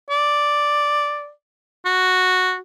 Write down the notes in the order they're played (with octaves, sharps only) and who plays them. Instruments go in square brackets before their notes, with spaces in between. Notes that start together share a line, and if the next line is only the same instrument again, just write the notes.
[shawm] D5
F#4